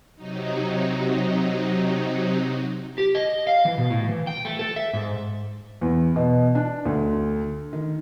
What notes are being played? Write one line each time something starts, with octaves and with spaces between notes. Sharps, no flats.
C3 F#3 D#4
G4
D#5
F5
E3
B2
A2
E3
G5
A3
A4
E5
G#2
E2
B2
D4
D2
D#3